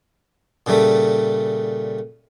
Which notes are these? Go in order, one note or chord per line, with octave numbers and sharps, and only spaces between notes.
A#2 C#3 G3 A3